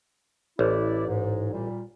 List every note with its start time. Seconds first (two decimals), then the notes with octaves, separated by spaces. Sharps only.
0.59 A1 E4 D5
1.06 G#2
1.51 A#2 G3